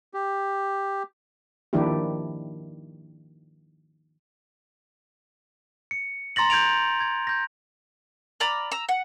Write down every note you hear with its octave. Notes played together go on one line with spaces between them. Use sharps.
G4
D#3 F3 A#3 D4 E4 G4
C#7
A#5 C6 A6 A#6 F#7
G6 G#6 D7 F7
G#6
G6 A#6
D5 A#5 B5 F6
A#5 E6
F#5